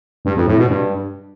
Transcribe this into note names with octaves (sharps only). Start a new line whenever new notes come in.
G2
F2
A2
B2
G2